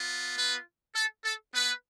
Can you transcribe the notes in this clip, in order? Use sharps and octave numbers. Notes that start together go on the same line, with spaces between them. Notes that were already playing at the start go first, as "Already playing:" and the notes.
Already playing: B3 F4
B3 B4
A4
A4
B3 B4